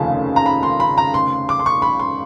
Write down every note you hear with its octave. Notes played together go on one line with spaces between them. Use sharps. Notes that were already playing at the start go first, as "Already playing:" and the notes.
Already playing: F1 D#2 C#3 F3 A3 A5
A#5
B5
C6
B5
A#5
C6
D6
C6
C#6
B5
C6